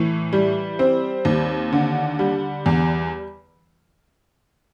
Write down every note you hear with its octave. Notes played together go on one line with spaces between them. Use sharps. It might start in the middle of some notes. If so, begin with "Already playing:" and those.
Already playing: A2 E3
G3
C4
D#2
D3
G3
E2